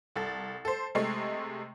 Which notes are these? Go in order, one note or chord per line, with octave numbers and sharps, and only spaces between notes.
C2 A4 A6
A4 C5
C3 G#3 A3